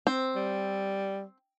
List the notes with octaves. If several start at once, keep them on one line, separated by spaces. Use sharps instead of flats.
C4
G3